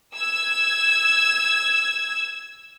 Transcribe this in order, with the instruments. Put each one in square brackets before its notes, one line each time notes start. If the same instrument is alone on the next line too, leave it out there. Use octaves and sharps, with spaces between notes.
[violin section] E6 G#6